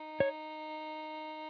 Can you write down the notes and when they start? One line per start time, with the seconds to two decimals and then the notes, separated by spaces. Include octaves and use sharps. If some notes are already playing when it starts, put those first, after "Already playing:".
Already playing: D#4
0.20 C#5